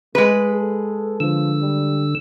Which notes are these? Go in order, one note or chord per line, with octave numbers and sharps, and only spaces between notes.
G#3 A3 B4
A4
D3 F3 E6
G3